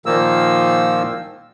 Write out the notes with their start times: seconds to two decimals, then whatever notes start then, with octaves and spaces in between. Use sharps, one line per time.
0.06 A#2 D#3 F3 A#3 E6